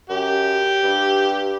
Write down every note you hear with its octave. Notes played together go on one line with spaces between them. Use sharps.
F#2 G4
G2